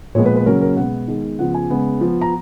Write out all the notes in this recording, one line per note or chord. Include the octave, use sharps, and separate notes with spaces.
A#2 F3 G#3 B3 C#5
B4
B4
C#3 F#3 A#3 C#4 A#4
A#4
B2 G#3 B3 F#5
D#3 G#3 B3
C#3 F3 B3 F#5
G#5
C#3 G#3 B3
F3 B3
A#5